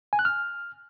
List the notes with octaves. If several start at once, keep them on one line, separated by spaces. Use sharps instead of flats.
G#5
F#6
F6